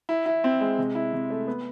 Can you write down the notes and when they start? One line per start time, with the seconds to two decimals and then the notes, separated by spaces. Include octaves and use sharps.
0.09 E4
0.26 E4
0.44 C4
0.61 G#3
0.78 C3
0.95 E4
1.13 C3
1.30 A3
1.47 B3